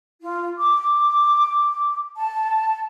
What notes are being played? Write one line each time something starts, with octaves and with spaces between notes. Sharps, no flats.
F4
D6
A5